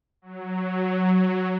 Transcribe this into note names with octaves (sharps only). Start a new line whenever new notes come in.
F#3